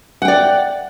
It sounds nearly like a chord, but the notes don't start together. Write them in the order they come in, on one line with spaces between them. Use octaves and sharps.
F#5 G5 D5